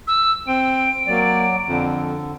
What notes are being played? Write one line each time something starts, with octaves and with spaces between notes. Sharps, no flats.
E6
C4 D7
F#3 A#3 D5
F2 D3